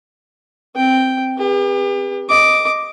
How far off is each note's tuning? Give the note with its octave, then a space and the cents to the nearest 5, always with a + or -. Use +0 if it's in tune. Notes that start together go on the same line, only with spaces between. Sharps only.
C4 +0 G5 +0
G4 +40 B4 -30
D#5 +0 D6 +0